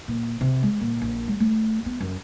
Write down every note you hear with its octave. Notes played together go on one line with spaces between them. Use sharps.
A#2
C3
G#3
A#2
A#1
G#3
A3
B3
F#2